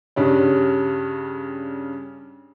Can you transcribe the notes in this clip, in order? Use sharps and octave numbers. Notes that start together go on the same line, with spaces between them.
G2 C#3 G3 C#4